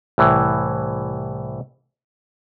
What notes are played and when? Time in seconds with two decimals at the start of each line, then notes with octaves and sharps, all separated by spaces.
0.18 C2 A2 E3